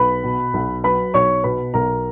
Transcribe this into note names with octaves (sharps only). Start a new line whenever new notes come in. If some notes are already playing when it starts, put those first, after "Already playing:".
Already playing: B1 B4 B5
B2
B1
F#3 B4 B5
B1 C#5 C#6
B2 B4 B5
B1 A#4 A#5